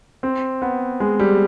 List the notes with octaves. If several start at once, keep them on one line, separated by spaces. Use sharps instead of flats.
C4
B3
G#3
G3